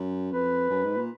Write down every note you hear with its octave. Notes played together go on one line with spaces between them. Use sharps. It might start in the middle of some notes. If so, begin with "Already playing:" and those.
Already playing: F#2
F2 B4
F#2
G#2
A#2